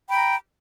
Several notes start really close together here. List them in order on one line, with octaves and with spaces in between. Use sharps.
G5 B5 A#5